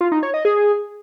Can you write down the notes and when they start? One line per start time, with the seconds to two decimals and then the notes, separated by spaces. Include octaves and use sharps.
0.01 F4
0.12 D#4
0.23 C#5
0.34 D#5
0.45 G#4